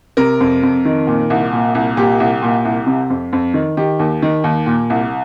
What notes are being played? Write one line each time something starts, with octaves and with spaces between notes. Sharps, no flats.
C3 A#4
F2
F2
D#3
A#2
C2
A#2
C2
A#2 G4
C2
A#2
C2
C3
F2
F2
D#3
D#3 G4
D#2
D#3
D#2
A#2
C2